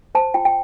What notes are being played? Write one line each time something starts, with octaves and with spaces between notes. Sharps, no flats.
C5 A5
F4 G5
G5